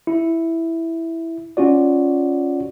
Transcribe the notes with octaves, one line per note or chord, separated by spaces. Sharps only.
E4
C#4 F4 F#4 D5